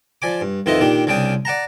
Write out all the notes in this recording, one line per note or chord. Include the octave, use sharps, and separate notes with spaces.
F3 D5 G#5 D6
G2
F2 D#3 E4 F4 B4 D#5
A#2 D#3 D4 G4
C2 C#3 D4 D5 G5 D#6
D5 F#5 A5 A#5